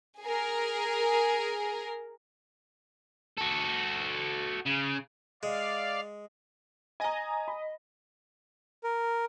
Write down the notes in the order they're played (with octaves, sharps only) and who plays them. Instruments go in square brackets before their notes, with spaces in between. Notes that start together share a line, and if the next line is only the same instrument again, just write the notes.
[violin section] G#4 A#4
[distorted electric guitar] F#4 A4
C#3
[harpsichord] G#3 [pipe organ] D5 F5
[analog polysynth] D#5 [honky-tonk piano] G#5 A#5
[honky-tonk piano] B5
[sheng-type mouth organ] A#4